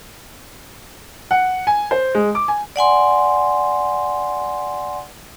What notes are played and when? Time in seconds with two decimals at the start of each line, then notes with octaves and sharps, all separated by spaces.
1.31 F#5
1.67 G#5
1.91 C5
2.15 G#3
2.35 D6
2.48 G#5
2.76 D5 F#5 G#5 C6